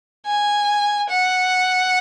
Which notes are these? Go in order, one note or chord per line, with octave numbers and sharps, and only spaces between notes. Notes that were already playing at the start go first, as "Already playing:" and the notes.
G#5
F#5